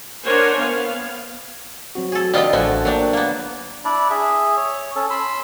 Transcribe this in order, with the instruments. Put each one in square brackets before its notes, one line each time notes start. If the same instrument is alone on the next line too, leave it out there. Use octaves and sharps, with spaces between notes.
[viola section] D4 A#4 C5 C#5 F#5 G#5
B3 F5
[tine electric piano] F#3 C4 F#4
[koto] G#4 A4
[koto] D3 D4 F4 [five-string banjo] G4 D#5 G5
[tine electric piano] A1 F#5 G#5 [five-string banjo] F3 A3 F#4
[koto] F#3 D4 [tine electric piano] A#3 C#5 G5
[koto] A#3 B3 [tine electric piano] F5
[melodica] D4 E4 D5
G#4 E5
C#5
C#4 A4
B5 C6 E6